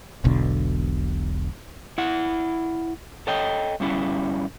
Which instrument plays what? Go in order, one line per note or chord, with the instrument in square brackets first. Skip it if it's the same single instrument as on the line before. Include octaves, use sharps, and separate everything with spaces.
[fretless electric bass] E1 B1 B2 D3
[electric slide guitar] E4 F#5
A4 C#5 D#5 G5
G2 G3 C#4 E4